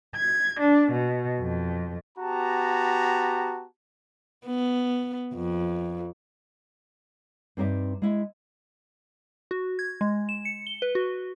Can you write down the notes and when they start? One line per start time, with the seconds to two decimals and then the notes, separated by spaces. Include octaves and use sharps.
0.15 G#6
0.58 D4
0.92 B2
1.40 F2
2.18 B3 F#4 G4 A5 A#5
4.47 B3
5.34 F2
7.57 G2 C4 D#4 D5 E5
8.02 G#3 E4
9.51 F#4
9.79 G#6
10.01 G#3
10.29 E7
10.45 C#7
10.67 G7
10.82 B4
10.95 F#4